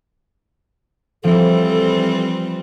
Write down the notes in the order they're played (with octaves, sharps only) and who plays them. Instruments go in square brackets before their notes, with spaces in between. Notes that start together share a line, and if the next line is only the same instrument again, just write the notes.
[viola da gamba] E3 G3 C4 [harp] F3 E5 [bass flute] A4